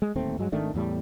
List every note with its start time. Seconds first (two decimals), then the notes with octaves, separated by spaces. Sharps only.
0.02 G#3
0.15 D1 D#2 A3 C4
0.39 G2 F#3 G#3
0.52 G#1 D#3 A3 D4
0.74 E2 A2 G3